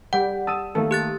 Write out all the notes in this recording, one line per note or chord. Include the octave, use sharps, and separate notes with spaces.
G3 F#5 G5
A5 D#6 E6 D#7
D#3 A3 A#3 A4
G4 F#6 A6